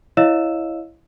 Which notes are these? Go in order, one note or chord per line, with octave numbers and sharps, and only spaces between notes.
E4 C#5 D#5 F5 E6 E7